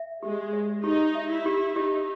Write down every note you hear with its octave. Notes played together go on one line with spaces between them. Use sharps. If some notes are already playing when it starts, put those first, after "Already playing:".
Already playing: E5
G#3 G4
C#5
D#4 G4
E5
E4
G4
D#4 G4